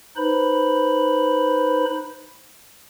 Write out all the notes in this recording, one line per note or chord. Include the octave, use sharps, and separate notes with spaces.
D#4 B4 C5 B5